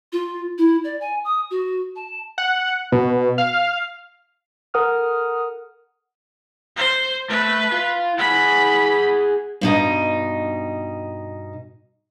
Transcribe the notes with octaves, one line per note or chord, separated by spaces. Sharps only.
F4
E4
D5
G#5
D#6
F#4
A5
F#5
B2
F5
A4 A#4 F#5 D#6 F6
C5
A3 A4 B4
F4
G#4 F#5 B5
G2 B2 D#4